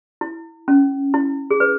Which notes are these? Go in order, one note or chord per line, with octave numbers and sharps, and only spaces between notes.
E4
C#4
E4
G#4
B4